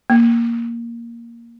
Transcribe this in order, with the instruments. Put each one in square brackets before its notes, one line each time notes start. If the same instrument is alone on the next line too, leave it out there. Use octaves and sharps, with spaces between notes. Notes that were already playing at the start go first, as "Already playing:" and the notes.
[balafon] A#3